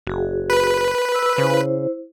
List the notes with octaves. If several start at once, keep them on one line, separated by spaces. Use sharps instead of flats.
F#1 F#4 G#4
B4
E6
C#3 E4 C5